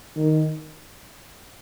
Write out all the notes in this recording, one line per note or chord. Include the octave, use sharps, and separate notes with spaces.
D#3